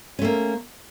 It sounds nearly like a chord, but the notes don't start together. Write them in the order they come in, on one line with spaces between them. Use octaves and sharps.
C#4 A3 A#3